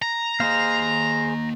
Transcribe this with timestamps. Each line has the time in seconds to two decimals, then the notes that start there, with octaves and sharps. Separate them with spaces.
0.02 A#5
0.40 A#3 G#4 C5 D#5 F5